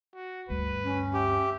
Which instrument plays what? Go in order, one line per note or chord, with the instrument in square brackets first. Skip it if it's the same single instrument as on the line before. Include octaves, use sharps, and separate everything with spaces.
[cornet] F#4
[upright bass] D2 G2 [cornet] B4
[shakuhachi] C#4
[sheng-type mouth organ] G4 [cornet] E5